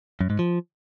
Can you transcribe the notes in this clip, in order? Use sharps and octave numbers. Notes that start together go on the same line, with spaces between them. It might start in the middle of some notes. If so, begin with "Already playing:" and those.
F#2
G#2
F3